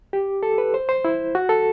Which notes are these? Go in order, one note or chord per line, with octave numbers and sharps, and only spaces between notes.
G4
A4
B4
C5
C5
E4
F#4
A4